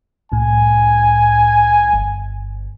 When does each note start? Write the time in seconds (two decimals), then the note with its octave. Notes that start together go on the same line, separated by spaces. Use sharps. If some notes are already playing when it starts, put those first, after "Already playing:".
0.32 C2 A2 G#5
1.93 G1